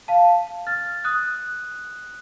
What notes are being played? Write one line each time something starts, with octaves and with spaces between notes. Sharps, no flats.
F5 A5
F6 A6
D#6 F#6